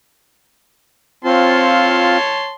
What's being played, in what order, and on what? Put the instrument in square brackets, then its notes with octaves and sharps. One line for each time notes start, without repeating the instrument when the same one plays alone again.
[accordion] C4 F4 [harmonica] C#5 A5 C6